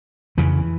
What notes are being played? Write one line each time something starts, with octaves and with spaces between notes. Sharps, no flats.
F2 C#3 E3